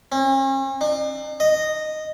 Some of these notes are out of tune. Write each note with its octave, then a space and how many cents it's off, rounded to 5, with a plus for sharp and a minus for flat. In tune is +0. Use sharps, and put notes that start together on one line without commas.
C#4 -45
D4 +45
D#5 -10